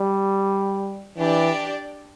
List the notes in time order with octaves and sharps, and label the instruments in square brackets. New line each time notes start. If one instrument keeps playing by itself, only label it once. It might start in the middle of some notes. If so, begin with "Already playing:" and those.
Already playing: [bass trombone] G3
[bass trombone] E3 [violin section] D4 G4 D5